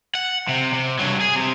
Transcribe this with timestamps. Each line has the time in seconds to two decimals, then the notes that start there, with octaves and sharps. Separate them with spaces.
0.15 F#5
0.48 C3
0.73 C3
0.99 G2 F#3
1.21 G#4
1.36 C3